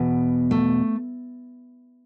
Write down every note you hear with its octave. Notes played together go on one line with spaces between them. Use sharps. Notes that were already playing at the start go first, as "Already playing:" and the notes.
Already playing: E2 B2
A3